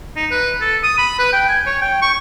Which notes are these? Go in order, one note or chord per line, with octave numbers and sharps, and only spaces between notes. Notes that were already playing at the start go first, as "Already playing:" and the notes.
D#4
B4
A4
D#6
B5
B4
G5
G#5
C#5
G5
C#6